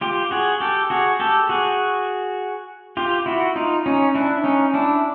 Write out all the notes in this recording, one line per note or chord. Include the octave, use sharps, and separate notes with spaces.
F4 G4
F#4 G#4
G4 A4
F#4 G#4
G4 A4
F#4 G#4
F4 G4
E4 F#4
D#4 F4
C#4 D#4
D4 E4
C#4 D#4
D4 E4